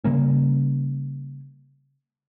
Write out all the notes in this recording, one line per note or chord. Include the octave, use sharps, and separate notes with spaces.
C#3 G3 A#3 C#4